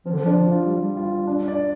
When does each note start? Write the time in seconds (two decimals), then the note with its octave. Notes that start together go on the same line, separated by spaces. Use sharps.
0.06 F3 C4
0.13 D3
0.21 F3
0.26 D4
0.46 F4
0.66 G3 G4
0.81 G3
0.97 F4
1.27 D4
1.48 D5